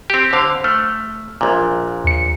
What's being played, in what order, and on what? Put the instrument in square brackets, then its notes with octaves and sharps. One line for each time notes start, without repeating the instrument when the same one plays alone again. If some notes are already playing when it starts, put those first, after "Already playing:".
[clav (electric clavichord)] C4 G4
[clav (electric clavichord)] D3 F5 [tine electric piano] C5
[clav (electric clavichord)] A3 [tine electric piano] F6
[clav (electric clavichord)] A#1 A#2
[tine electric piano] D#2 C#7